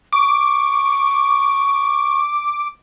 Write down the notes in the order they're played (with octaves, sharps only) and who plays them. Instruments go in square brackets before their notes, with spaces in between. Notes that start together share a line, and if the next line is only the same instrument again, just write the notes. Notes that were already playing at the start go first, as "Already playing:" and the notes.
[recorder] C#6 [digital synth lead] D6